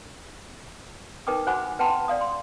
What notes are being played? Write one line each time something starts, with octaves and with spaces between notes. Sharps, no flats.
D#4 A#4 B4 G5 D6 D#6
F#4 C5 F#5 G#5 B5 D6
B4 F#5 G5 A5 B5 C6
D5 F5 D#6
C6